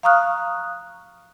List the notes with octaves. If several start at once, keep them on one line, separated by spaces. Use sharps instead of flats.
F5 A#5 C#6 D#6 F6 F#6